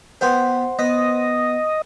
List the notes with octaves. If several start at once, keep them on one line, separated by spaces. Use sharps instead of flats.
B3 G4 C5 F#5 C6
B3 D#5